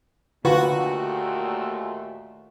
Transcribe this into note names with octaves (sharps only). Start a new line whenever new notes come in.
D#2 A#2 D3 A3 F4 F#4 B4